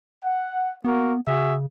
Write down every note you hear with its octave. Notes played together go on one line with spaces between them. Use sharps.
F#5
A#3 B3 F#4 A#4
C#3 F#4 G#4 E5